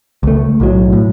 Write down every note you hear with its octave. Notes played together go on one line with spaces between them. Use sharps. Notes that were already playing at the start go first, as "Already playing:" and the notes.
C#2 A3
B1 A2 F#3
A2